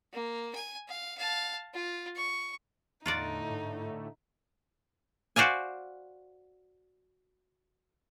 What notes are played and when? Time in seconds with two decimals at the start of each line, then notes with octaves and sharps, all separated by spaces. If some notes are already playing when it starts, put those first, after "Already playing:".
0.13 A#3
0.55 G#5
0.88 F5
1.17 F5 A5
1.74 F4
2.16 C#6
3.06 E2 A2 D3 A3 D#4 F4 F#4 D5
3.50 G#2
5.36 F#4 C5 D5 F5 G#5